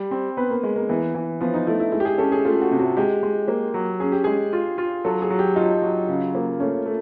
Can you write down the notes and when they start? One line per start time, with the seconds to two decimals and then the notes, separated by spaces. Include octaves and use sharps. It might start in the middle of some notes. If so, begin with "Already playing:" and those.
Already playing: G3
0.11 C4
0.37 B3 B4
0.50 A#3
0.63 G#3
0.76 A#3
0.89 E3 B3
1.15 E3
1.41 F3 B3
1.54 D#4
1.67 A3 E4
1.80 E4
1.92 G#3 E4
2.00 G4
2.05 G#4
2.18 C#4 A4
2.32 G#4
2.45 A3 F4
2.61 F#4
2.71 C3
2.79 F#4
2.97 G#3 G4
3.23 G#3
3.48 A#3
3.74 F#3
4.00 C#4 G#4
4.12 G4
4.24 G#3 G#4
4.53 F4
4.78 F4
5.04 F#3 A4
5.22 G#4
5.30 F#3
5.39 G4
5.56 D#4 F4
5.82 F#3
6.09 C#3
6.35 A#3
6.60 A3 C#4
6.85 A3